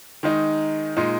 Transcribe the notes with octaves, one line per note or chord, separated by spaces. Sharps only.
D#3 G#3 D#4
A#2 G#3 D#4